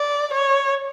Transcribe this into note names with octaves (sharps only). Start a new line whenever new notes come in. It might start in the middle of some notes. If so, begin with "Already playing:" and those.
Already playing: D5
C#5